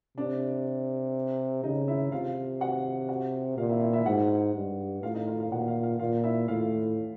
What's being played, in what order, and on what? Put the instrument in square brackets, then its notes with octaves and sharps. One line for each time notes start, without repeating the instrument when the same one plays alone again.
[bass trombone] C3 [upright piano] D4 D5
[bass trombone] C#3 [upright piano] D#4 D#5
[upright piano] E4 E5
[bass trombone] C3 [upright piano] F4 F5
[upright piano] F#4 F#5
F#4 F#5
[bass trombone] A#2 [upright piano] F4 F5
[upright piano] E4 E5
E4 E5
E4 E5
[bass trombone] G#2 [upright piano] F#4 F#5
[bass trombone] G2
[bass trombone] A2 [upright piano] F4 F5
[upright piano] D#4 D#5
F4 F5
F4 F5
[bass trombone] A#2 [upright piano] F#4 F#5
[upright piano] F4 F5
F4 F5
[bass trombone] A#2 [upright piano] F4 F5
[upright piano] E4 E5
[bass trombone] A2 [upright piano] F4 F5